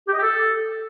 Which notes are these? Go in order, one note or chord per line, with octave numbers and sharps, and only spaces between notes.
G4
D#5
G4
A4